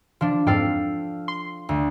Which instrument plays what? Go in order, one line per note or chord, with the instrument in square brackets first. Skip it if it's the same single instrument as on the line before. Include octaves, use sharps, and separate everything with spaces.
[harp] F3 D4
[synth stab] F2 G#2 [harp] A4 F5 G5
[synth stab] C6
[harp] D2